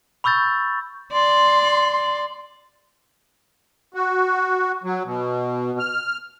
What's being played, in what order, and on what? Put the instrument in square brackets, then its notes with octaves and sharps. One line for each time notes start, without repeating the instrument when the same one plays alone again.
[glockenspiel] B5 C#6 E6 G6 A6
[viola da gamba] D5 [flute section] C6
[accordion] F#4
F#3
B2
F6